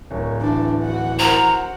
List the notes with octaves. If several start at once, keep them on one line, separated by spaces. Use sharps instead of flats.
D1 A#4 C#5
E3 D4
F#4 F#5
A#4 C5 A#5